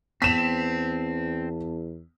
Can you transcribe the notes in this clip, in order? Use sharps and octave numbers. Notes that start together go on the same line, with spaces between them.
E2 B3 C4 A5 B6 E7